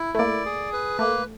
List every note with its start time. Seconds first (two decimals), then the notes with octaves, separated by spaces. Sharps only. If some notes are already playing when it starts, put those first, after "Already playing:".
Already playing: E4
0.15 A3
0.18 A#3 D5
0.46 G#4
0.73 B4
0.99 A3 A#3